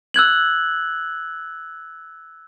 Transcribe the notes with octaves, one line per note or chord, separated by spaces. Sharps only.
E6 F#6 G#6 F#7